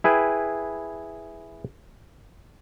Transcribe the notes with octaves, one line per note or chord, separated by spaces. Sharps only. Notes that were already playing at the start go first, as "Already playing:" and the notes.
E4 G#4 B4 G5